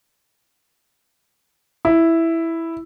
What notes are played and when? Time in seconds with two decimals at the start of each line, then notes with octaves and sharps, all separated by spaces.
1.85 E4